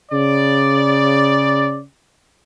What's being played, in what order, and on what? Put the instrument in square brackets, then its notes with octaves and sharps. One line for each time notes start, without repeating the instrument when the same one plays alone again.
[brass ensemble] C#3 D5